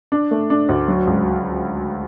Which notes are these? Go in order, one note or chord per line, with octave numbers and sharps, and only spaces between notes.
D4
A3
D4
D2
F#3
C#2